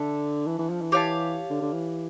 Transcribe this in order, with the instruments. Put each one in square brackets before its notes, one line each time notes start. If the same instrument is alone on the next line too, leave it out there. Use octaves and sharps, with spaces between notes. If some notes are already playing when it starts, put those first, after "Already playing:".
Already playing: [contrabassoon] D3 [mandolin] D4 A4 E5
[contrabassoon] E3
E3
F3
E3
[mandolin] G4 C#5 F5 A5
[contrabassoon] D3
D3
E3